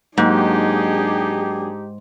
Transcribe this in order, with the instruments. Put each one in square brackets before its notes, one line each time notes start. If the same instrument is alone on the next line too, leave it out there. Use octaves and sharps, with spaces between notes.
[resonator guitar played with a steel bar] G#2 [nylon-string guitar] F#3 A#3 [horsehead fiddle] D4 G#4 [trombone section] D#4 G4